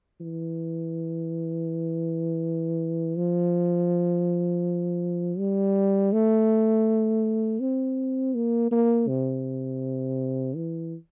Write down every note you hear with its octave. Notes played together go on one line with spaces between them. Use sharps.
E3
F3
G3
A3
C4
A#3
A#3
C3
E3